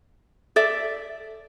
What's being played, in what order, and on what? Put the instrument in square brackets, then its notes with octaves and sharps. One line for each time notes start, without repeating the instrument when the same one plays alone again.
[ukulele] A4 D5 E5